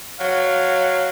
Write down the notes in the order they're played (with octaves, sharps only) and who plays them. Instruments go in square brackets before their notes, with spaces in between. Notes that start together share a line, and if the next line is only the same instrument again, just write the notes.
[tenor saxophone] F#3 [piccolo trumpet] F5